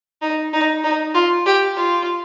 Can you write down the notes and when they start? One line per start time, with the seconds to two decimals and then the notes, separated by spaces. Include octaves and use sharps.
0.22 D#4
0.53 D#4
0.84 D#4
1.14 F4
1.46 G4
1.77 F4